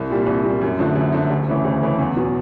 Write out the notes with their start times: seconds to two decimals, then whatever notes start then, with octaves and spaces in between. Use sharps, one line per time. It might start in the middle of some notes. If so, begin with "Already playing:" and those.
Already playing: C2
0.10 A#2 G3
0.26 C2
0.44 A#2 G3
0.61 F#2
0.79 D3 F3 A3
0.95 F#2
1.12 D3 F3 A3
1.30 D2
1.48 C#3 E3 A3
1.65 D2
1.82 C#3 E3 A3
1.98 E2
2.16 B2 F#3 B3